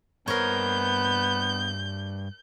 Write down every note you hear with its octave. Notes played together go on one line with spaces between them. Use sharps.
G2 B3 A#4 C5 C#5 G6